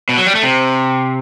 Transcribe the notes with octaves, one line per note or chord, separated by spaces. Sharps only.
B2
F#3
G3
A3
C3